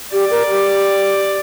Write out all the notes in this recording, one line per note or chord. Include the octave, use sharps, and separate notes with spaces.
G4 D5
A#4
G4